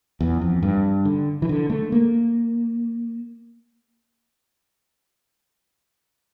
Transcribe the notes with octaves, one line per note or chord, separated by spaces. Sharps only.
E2
F2
G2
D3
E3
D3
A3
A#3